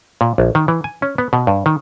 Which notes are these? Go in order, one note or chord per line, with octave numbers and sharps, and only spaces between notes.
A#2
A#1
D#3
E3
G#5
C#4
B3
B2
G2
D#3